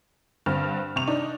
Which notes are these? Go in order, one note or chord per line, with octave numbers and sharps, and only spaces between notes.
G2 D3 C4 F6
C3 C#6 F7
D4 D#4